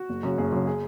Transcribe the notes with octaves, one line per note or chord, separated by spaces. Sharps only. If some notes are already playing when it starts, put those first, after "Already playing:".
Already playing: F#4
F#1
F#2 C#3
F#1 G#4
F#2 C#3
G#4